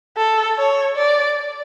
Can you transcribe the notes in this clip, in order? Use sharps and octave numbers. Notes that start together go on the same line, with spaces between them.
A4
C#5
D5